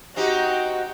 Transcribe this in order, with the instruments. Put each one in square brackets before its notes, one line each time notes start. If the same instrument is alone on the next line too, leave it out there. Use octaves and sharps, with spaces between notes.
[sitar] C4 D#4 G4 [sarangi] F#4